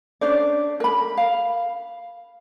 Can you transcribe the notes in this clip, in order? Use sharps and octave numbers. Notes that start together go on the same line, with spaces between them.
C#4 D4 C5 D5
A#4 B5
F5